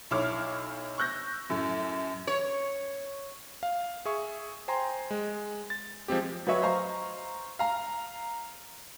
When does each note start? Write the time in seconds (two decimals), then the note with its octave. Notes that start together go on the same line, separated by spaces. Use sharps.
0.11 B1 E4 C#5 D6 F6
0.98 C#6 E6 F#6 G6 A#6
1.50 F#2 A2
2.27 C#5
3.63 F5
4.05 G#4 E5 C#6
4.68 C5 G5 G#5 A#5 C6
5.11 G#3
5.70 A6
6.08 F3 G#3 C4 G4
6.47 F#3 F#4 B4 C#5 D#5 E5
6.62 C5 D#5 F5 A#5 C#6
7.59 F5 A#5